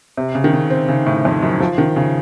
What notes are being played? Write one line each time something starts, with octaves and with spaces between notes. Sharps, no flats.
C3
C#3
D#3
C#3
C4
C#3
A2
F2
F#2
F3
D#3
C#3